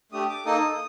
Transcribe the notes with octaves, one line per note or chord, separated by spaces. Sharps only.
A3 D4 G4 D#6
D6
A#3 D#4 A4 D#6